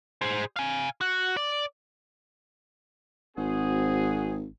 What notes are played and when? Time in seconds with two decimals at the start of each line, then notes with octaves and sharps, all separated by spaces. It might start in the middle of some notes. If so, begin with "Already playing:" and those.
0.22 G#4 C5
0.56 F5 G#5
1.01 F#4
1.37 D5
3.37 G#1 C4 F#4 G#4